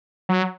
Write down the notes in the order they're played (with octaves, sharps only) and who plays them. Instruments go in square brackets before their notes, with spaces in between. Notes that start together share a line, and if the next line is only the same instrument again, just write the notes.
[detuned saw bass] F#3